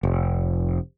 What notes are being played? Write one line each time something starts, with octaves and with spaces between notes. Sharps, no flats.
F1